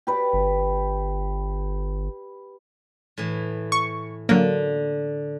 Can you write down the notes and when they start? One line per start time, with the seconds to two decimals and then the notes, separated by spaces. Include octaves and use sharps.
0.07 G4 B4 D5
0.33 G1
3.18 A2 E3
3.72 C#6
4.29 D3 F#3 A#3